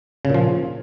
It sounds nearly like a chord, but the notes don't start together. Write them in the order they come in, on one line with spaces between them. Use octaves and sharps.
C#3 A#2 F3